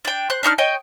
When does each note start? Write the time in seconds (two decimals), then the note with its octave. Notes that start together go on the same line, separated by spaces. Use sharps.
0.05 D4 G5
0.30 C5 F#6
0.43 D4 D#4 C#6 F6
0.58 C#5 D#5 G5